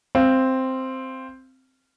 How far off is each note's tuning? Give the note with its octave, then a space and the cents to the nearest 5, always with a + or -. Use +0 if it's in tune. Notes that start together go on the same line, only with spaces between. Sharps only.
C4 +0 F5 -20